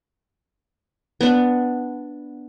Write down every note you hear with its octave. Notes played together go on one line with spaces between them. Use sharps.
B3 D4